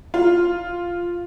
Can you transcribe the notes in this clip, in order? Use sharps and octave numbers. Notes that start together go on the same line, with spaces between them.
F4